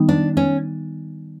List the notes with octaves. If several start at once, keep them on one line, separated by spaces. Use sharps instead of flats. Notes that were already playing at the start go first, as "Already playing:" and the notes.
Already playing: D#3 G3 B3 D#4
D4
C#4